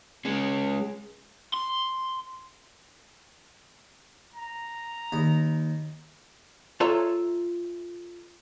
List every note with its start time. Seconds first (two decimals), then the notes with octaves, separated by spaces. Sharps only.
0.25 G#3 C#4
1.54 C6
4.33 A#5
5.12 D#2 B5
6.80 F4 A4 C#5 E5 A5 A#5